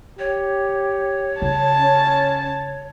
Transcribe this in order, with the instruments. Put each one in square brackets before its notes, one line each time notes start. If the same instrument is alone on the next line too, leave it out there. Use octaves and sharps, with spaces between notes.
[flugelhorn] G4 [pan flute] C#5
[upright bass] C#3 [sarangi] A5
[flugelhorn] C#4